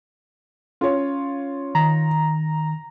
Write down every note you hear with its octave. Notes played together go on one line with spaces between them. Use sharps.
C#4 F4 C#5
D#3 A#5